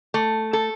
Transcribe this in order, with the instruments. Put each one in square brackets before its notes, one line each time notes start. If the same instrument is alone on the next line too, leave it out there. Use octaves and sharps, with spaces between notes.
[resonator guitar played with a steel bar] A3
A4